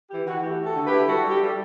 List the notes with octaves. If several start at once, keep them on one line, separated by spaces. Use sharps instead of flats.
E3 G4
E3 F#4
A3 G4
A3
F#4 A4
D3
G4 B4
E4
G3 F#4 A4
G3 G4
G3